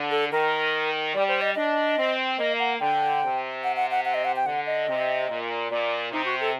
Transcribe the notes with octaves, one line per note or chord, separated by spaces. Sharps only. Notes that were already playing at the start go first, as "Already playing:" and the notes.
Already playing: D3
A4
D#3 A#4
G3 D5
C5
D#5
D4 D#5
C4
A#3 D#5
F#5
D3 G5
C3
F#5
F#5
F#5
F#5
D#5
F#5
G5
D3 F#5
D#5
C3
A#2
A#2 D5
C3 D#4
F#4
A4